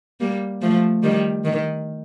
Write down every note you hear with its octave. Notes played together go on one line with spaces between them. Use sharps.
G3 A#3
F3 A3
D#3 G3
D#3